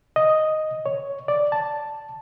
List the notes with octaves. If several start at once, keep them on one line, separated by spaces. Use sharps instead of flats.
D#5
C#5
D5
A5